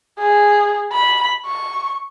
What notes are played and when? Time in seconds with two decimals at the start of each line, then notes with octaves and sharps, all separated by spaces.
0.19 G#4
0.93 B5
1.46 C#6